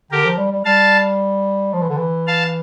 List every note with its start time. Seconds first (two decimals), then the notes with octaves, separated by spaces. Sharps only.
0.11 D3 G4 A#4
0.25 F3
0.37 G3
0.52 G3
0.65 G3 F5 A5
1.73 F3
1.82 E3
1.89 D3
1.97 E3
2.27 F5 A5